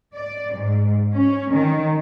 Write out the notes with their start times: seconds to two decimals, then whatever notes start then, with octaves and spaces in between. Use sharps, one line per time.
0.14 D5
0.53 G#2
1.13 C#4
1.51 D#3